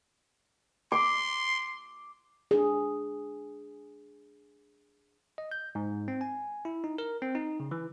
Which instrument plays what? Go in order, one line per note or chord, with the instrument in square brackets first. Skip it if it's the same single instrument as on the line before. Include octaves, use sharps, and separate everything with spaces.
[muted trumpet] C6 [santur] D6
[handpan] D4 G#4
[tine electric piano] D#5
G6
G#2
C4
G#5
E4
D#4
A#4
C4
D#4
C#3
E3